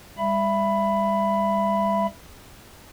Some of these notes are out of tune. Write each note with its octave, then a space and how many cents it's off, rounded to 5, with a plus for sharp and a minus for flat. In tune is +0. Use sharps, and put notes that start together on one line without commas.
G3 +35 E5 +25 B5 +0